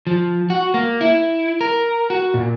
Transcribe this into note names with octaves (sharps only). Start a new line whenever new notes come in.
F3
F#4
A#3
E4
A#4
F#4
A#2